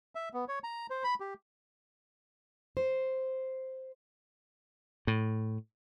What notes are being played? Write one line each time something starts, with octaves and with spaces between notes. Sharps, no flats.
E5
B3
C#5
A#5
C5
B5
G4
C5
A2